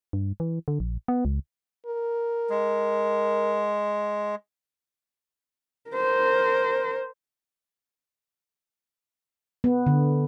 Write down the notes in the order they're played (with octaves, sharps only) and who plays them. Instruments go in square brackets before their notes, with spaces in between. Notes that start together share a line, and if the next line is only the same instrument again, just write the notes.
[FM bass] G2
E3
D3
A#1
B3
C#2
[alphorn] A#4
[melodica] G#3
[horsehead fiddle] A#4 C5
[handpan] B3
D3